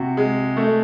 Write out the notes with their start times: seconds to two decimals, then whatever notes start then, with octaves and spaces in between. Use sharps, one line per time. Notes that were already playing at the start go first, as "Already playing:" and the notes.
Already playing: C3 F#4
0.17 G#3
0.57 A3